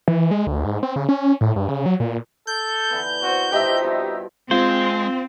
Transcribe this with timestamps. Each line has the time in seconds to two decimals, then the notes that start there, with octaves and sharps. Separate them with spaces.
0.08 E3
0.31 G#3
0.47 D2
0.65 G#2
0.83 C4
0.96 C#3
1.09 C#4
1.41 A2
1.56 G2
1.68 C#3
1.86 F#3
2.00 A#2
2.47 A4 G6
2.90 D3 E3 B3
3.23 C4 F#4
3.52 F3 D#4 F#4 G4 D#5 E5
3.84 G2 B2 E4
4.51 G#3 C4 F4 C5